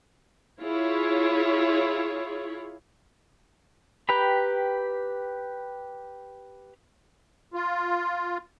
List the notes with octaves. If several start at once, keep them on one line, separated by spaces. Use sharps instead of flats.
E4 F4 G#4 C#5
G4 B4 G5 A#5 B5
F4